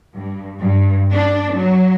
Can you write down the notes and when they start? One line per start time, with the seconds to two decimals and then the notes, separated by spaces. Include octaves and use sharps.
0.15 G2
0.61 G2
1.11 D4
1.55 F#3